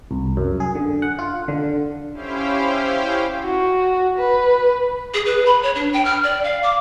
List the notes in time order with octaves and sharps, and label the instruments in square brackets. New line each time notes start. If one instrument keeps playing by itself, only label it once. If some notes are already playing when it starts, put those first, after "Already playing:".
[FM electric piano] C2
F#2
G#4
D3
F#5
F4
D3
[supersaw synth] C#4 E4 G4 C5 F5 G5
[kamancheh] F#4
B4
[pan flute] G#4
B4
B5
C#5
D4
G5
F6
D5
F5
D6